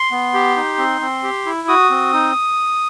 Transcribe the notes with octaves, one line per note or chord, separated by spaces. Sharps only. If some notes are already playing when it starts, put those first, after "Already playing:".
Already playing: C6
B3
G4
D#4
C4
C4
G4
E4
F#4 D#6
C4
D#4